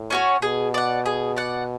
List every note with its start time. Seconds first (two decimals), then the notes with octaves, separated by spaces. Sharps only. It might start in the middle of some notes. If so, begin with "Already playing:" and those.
Already playing: A2
0.10 C#4 F#4 C#5
0.42 B2 G#4
0.74 D5 F#5
1.06 G#4
1.36 D5 F#5